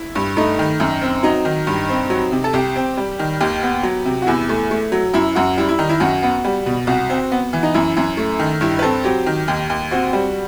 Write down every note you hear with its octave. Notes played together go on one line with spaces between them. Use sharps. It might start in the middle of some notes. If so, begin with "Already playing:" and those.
Already playing: E4
G2
A3 D#4
D#3
F#2
C4
F#3 D#4
D#3
G2
C4
F#3
C3
A4
C2 G4
C4
G3
D#3
D#2 G4
B3
F#3
C3
F#4
E2 E4
A3
A3
F#3
F#2 E4
F#2 F#4
G3 E4
E4
D#3 D#4
E4
F#2 F#4
B3
G3
B2
C2 F#4
C4
B3
E3
D#4
F#2 E4
F#2
A3
D#3
G2 E4
B4
C4 A4
F#3 G4
D#3
D#2
D#2
C4 F#4
G3